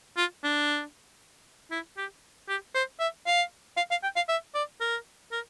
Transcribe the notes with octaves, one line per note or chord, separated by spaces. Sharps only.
F4
D4
E4
G4
G4
C5
E5
F5
F5
F5
G5
F5
E5
D5
A#4
A#4